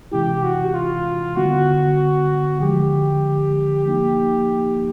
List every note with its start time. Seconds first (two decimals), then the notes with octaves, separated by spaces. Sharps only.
0.12 C3 E3 G#3 C#4 E4 G4
0.43 F#4
0.74 F4
1.37 D3 G3 B3 F#4
2.61 D3 F3 G#3 G4
3.86 F3 A#3 D#4